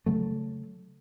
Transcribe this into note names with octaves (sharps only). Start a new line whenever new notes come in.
C#3 F#3 A3